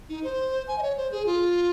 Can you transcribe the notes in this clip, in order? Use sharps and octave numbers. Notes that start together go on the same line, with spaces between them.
D#4
C5
G#5
D#5
C#5
C5
G#4
F4